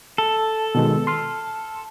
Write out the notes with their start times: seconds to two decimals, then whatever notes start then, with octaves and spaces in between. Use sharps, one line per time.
0.18 A4
0.75 B2 D#3 G#3
1.07 C6 F6